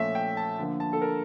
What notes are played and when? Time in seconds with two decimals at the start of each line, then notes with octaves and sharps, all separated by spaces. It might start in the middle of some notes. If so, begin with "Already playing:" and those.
Already playing: A#2 F3 A3 C#4 E5
0.15 G5
0.37 A5
0.59 D3 F3 A#3
0.80 A5
0.93 A4
1.02 A#4